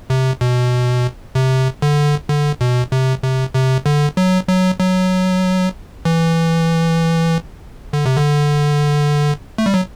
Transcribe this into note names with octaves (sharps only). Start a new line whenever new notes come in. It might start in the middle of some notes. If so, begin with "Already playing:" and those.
C3
B2
C3
D3
D3
B2
C3
C3
C3
D3
F#3
F#3
F#3
E3
D3
C3
D3
A3
G3
F#3